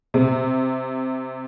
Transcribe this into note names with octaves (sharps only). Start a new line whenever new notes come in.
C3